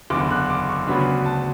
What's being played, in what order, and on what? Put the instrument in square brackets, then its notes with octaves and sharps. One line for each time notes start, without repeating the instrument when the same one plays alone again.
[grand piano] F#1 E2 D3 D6
F#6
D6
C#6
D2 C#3 F#3 B3 D4 B5
A5